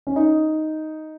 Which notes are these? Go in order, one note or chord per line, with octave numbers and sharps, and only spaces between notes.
C#4
D#4